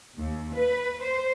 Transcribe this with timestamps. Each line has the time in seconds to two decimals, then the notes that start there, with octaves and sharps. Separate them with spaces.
0.19 D#2
0.56 B4
1.03 C5